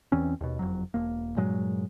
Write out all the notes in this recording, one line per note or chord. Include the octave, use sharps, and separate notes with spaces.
E2 E3 C4 C#4
D#2 B2
F#1 F2 F#3
E1 A#3
G2 A#2 F#3 G#3